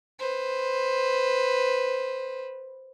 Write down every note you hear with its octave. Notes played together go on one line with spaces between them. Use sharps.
B4 C5